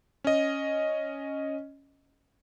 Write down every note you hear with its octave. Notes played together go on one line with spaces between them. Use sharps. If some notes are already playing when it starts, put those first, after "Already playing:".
C#4 D#5